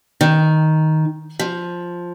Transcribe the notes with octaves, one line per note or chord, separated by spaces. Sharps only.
D#3
F3